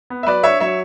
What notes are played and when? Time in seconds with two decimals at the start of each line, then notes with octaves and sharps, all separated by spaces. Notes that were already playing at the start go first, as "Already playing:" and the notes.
0.10 B3
0.23 E5
0.27 F#3 B4 D5
0.43 D4 C#5 E5
0.60 F#3 C#5 E5